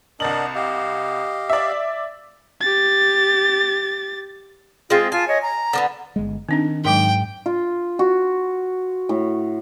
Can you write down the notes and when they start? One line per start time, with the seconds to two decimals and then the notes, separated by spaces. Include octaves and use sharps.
0.20 C2 D4 A#4 D#5 A6 F#7
0.55 G4 D#5 F5
1.50 D5 E5
2.61 G4 A6
4.90 G#3 C4 F4 G#4
5.12 F4 G#5 A5
5.27 C#5 D#5
5.41 A#5
5.73 D3 A#3 B3
6.16 G1 G#3
6.49 D#3 C4 D4 D#4
6.85 G#2 F#3 G#3 A#4 G5
7.46 F4
7.99 F#4
9.09 A2